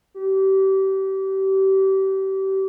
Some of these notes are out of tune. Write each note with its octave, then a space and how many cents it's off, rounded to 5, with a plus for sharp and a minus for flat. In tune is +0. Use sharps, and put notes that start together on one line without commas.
G4 -30